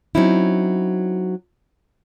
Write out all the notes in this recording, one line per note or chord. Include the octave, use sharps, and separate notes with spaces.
F#3 C4 C#4 D#4 E4